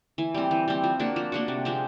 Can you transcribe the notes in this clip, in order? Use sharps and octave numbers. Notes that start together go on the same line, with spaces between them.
E3
G3 C4
E3
G3 C4
F3
A#3 D4 F#4
F3
A#3 D4 F#4
C3
F3 G#3 C4